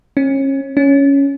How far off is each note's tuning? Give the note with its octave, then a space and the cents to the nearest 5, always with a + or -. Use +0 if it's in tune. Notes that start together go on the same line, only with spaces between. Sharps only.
C#4 -30
C#4 +5